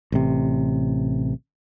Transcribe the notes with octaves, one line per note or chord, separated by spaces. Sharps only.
A1 C3